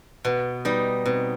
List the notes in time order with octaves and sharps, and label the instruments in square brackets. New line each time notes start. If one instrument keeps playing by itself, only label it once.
[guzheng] B2 [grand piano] B3
[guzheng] G3 D#4 [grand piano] B3
[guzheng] B2 [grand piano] C4